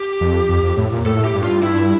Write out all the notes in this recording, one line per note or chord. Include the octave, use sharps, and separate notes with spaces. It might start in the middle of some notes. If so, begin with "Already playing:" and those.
Already playing: G4
F2
F2
F2
A2
A#2
A2 A4
G4
G2
F4
E4